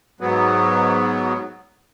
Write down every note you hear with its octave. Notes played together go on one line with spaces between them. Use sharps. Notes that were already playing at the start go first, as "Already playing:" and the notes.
G#2 F#3 B3